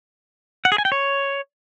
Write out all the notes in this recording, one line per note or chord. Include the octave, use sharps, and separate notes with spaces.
F#5
G#4
G#5
G5
C#5